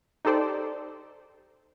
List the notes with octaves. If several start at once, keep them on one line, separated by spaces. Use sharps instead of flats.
D#4 G4 A4 C5 D5